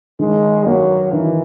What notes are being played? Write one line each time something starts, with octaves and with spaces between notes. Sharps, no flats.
D#3 G#3
F#3 A#3
D#3 E3